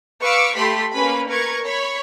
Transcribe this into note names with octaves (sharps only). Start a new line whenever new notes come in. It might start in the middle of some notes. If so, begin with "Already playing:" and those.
B4 F5 C#6 D6 E6
A3 G4 B5 C6 B6
A#3 C#4 B4 B5
A#4 B4 C#6 G#6
C#5 B5